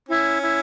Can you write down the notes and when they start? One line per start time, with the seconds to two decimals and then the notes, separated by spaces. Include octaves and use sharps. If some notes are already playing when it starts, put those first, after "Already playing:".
0.09 C#4 E4
0.42 E4